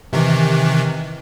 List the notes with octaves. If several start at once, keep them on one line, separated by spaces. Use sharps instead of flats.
C3 D#3 E3